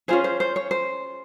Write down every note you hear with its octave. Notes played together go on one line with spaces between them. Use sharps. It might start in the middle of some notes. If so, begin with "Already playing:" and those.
C#4 F4 G#4 C5
C5
C5
C#5
C5